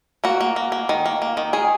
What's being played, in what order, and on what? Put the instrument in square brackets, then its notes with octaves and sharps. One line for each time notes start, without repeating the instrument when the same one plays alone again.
[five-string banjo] A#3 F#4
A#3
A#3
A#3
D#3
A#3
A#3
D#3
D#3 G#4